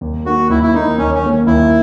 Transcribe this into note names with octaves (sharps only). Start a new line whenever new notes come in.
D#2
D#3 A#3 F#4
D#2 E4
E4
D#3 A#3 D#4
D#2 C#4
C#4
D#3 A#3
D#2 E4